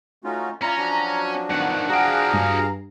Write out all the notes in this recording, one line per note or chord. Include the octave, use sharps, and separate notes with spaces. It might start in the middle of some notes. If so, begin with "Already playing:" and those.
A3 C#4 D#4 F4 F#4
C#4 E4 F4 D5 A#5
F3 F#3 D4 F#4
G2 D#3 F#5
F#4 G#4 F5 G5 A#5
G2